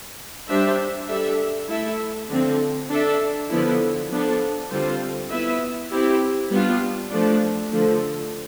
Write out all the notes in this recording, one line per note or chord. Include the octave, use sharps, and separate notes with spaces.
G3 D4 G4 C5 E5
G3 D4 A4 E5
A3 E4 A4 E5
D3 F3 C4
D4 A4 E5
D3 F3 B3 E4
F3 B3 D4 A4
D3 G3 C4 F4 C5
B3 E4 B4 E5
C4 E4 G4
G3 B3 D4 F4
F3 A3 D4
D3 F3 A3